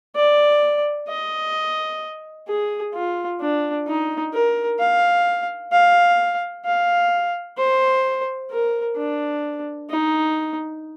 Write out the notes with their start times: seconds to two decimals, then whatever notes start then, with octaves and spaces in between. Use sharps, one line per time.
0.16 D5
1.08 D#5
2.48 G#4
2.94 F4
3.41 D4
3.87 D#4
4.33 A#4
4.80 F5
5.72 F5
6.65 F5
7.58 C5
8.51 A#4
8.97 D4
9.90 D#4